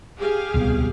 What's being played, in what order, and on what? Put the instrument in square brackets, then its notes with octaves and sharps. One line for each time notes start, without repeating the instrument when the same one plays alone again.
[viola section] G4 G#4 F5
[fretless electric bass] D1 C2 B2